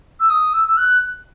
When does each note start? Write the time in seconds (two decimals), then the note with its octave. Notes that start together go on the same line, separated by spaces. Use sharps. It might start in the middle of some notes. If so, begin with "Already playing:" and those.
0.20 E6
0.30 D#6
0.53 E6
0.68 E6
0.77 F#6